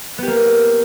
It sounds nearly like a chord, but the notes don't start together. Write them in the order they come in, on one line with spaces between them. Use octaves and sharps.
B3 G4 A#3